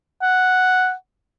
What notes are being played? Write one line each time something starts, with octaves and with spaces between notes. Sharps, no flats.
F#5